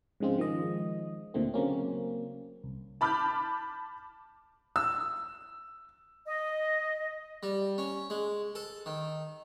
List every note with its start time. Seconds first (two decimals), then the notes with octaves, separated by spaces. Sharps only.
0.20 G#2 C#3 F3 G#3 C4 F4
0.38 D#3 F3 G#3 D#5
1.34 D2 A#2 D3 A3 C4
1.54 C#3 F#3 A#3 C4 C#4
2.64 C2
3.01 A5 B5 D6 F6 G6
4.76 E6
6.26 D#5
7.43 G3
7.78 C#4
8.10 G#3
8.55 A4
8.86 D#3